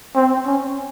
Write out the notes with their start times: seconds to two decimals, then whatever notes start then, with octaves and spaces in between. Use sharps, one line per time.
0.15 C4
0.46 C#4